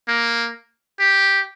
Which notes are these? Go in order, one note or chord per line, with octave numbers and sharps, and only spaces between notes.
A#3
G4